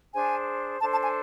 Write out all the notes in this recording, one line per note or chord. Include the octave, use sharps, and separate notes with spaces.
D4 G#4 C5 G#5
D4 A4 C5 A5
A5
G#5